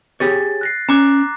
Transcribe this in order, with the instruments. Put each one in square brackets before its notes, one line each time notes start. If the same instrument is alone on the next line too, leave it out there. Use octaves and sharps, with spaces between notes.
[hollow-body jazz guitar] G4 G#4 C#5 [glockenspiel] A6
[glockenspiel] F#6 A#6 C7
[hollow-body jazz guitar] C#4 [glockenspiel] A#5 D6 F#6